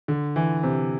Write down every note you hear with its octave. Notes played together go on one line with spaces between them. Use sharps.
D3
E3
C3